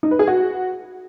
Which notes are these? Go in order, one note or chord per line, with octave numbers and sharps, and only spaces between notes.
D#4
B4
G#4
F#4